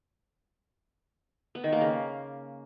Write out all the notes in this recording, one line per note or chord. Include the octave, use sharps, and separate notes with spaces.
B3
D#3
A#3
C#3